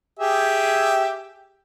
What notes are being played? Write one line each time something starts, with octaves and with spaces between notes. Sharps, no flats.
G4 G#4 E5